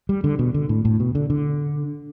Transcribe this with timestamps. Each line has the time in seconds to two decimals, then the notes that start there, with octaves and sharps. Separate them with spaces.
0.09 G3
0.24 D3
0.39 B2
0.54 D3
0.69 A2
0.85 A2
1.00 B2
1.15 D3
1.30 D3